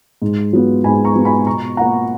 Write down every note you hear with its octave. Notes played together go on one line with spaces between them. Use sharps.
G#2
F#3 B3 F4
G#2 G#5 B5
A#5 C#6
F#3 B3 F4
G#5 B5
B2 A#5 C#6
A#3 F4 F#5 A#5